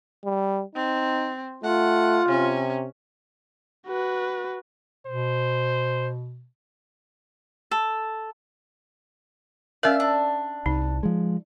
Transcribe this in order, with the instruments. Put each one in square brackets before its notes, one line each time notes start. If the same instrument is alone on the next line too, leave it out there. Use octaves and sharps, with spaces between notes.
[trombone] G3
[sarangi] C4 [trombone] D#4
[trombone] A3 [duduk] F4 [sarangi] F#5
[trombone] C3 [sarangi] C#4
[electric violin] F#4 B4
[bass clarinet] B2 [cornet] C5
[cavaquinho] A4
[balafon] C#4 A#4 [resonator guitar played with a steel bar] D5 E5 [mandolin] F5
[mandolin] D4
[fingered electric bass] C2 [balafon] D#4
[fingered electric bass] F3 G#3